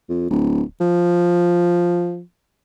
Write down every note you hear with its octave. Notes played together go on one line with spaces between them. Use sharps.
F2
D1
F3